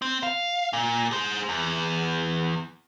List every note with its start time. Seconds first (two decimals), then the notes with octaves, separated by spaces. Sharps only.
0.02 C4
0.23 F5
0.73 A#2
1.11 G#4 C5
1.49 E2